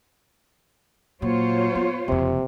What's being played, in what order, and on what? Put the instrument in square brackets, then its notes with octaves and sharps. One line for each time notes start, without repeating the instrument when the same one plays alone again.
[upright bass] A#2 [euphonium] F#3 [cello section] F4 C5 C#5
[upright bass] B3
[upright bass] F#1 F2 [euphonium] C3